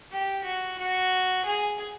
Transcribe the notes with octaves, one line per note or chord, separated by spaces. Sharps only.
G4
F#4
F#4
G#4